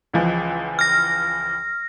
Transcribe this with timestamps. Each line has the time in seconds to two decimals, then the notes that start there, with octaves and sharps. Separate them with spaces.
0.13 C#2 E3 F3
0.79 F6 A#6